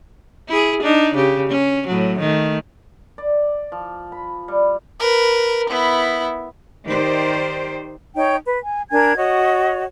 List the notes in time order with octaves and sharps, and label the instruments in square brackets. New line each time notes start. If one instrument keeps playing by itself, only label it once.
[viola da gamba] E4 G#4
D4 D#4
C#3 G4
C#4
A2 F#3
D#3 A3
[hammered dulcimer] D5
F3
B5
G3
[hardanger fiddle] A#4 B4
B3 E4
[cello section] D#3 G4 C5 D5
[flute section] D#4 C#5 G5
B4
G#5
D4 A#4 G#5 G#6
F#4 C#5 D#5